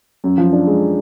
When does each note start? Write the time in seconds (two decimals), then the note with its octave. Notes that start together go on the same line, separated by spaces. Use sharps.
0.24 F#2
0.38 F3
0.53 D4
0.67 G#3